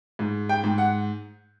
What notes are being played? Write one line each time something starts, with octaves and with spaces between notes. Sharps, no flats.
G#2
G5
G#2
F#5